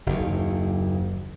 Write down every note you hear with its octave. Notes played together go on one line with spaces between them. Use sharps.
F#1 D#2